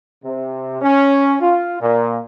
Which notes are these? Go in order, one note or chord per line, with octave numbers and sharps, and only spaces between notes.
C3
C#4
F4
A#2